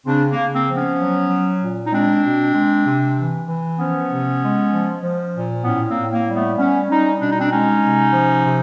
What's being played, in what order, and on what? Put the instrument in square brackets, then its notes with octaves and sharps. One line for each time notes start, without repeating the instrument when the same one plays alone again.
[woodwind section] C#3 C4 D4
A#3
C#3
A#3 C4
F3
B3 C#4
F#3
F#3
A#2
D#4
G#3 C4 D4
B2
G#3
C3
E3
E3
F3 B3 C#4
C3
G#3
F3
F3
A#2
A2 B3 C#4
A#3 C4
A2
A#3
G3
A3 B3
G3 B3 C#4
G3 C#4 D#4
B2 D4
D#4
C4 D4
G#3 C#4 D#4
C3
F3
C3